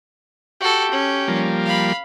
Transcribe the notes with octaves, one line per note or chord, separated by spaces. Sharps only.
F#4 G4 A4
C#4
F3 G3 A#3
F5 B5